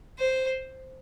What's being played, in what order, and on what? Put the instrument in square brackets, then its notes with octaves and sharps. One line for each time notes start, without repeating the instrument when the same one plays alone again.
[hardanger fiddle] C5